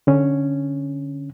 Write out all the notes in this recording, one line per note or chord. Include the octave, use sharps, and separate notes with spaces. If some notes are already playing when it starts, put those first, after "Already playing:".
D3 C#4